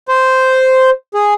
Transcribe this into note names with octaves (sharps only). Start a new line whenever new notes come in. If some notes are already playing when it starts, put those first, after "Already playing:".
C5
G#4